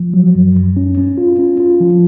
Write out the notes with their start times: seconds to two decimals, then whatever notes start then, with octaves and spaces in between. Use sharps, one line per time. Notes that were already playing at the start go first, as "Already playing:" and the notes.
Already playing: F3
0.14 F#3
0.35 F#2
0.55 F#2
0.77 C#4
0.98 C#4
1.18 F4
1.39 C#4
1.60 F4
1.80 F3